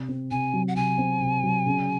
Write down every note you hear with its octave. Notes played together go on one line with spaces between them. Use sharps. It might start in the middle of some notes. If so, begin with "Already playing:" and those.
Already playing: C3
C4
C3 G#5
F#3
F#5
C3 G#5
C4
C3
F#3
C#3